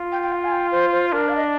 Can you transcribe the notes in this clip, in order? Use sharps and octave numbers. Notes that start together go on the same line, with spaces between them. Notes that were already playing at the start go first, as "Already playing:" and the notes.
Already playing: F4
G5
G5
F5
G#5
G5
C5
C5
D4 A#4
F5
D#5